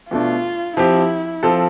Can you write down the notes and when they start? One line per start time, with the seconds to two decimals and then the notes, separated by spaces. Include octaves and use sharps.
0.11 B2 A3 D4 F4
0.77 F3 C4 E4 G4
1.43 F3 C4 F4 A4